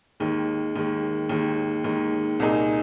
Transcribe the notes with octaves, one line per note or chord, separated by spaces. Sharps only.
D#2 D#3 G#3
D#2 D#3 G#3
D#2 D#3 G#3
D#2 D#3 G#3
C2 A#2 A#3 D#4 G#4